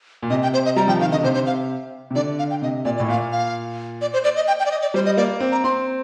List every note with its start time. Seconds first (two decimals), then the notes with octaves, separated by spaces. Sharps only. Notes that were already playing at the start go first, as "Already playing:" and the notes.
0.23 A#2
0.30 C3 D#5
0.43 G5
0.54 C5
0.65 D#5
0.76 G3 A#5
0.88 F3 G5
0.99 D#3 F5
1.11 D3 D#5
1.23 C3 C5
1.34 C5
1.46 F5
2.11 C3
2.15 D3 D5
2.39 F5
2.51 G5
2.62 C3 D#5
2.85 A#2 D5
2.97 D5
3.00 A2
3.08 A#2 F5
3.32 F5
4.01 D5
4.14 C5
4.24 D5
4.36 D#5
4.48 G5
4.59 G5
4.66 D5
4.71 D#5
4.82 D5
4.94 G3 C5
5.06 D#5
5.17 A#3 D5
5.40 C4
5.52 A#5
5.64 C4 C6